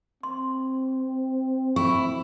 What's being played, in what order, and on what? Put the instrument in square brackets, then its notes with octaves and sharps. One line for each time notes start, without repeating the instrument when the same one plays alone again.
[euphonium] C4 [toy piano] C6
[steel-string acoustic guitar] E4 [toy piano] C#6